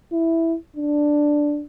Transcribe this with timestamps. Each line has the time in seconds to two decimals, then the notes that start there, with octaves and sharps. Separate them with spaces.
0.12 E4
0.76 D4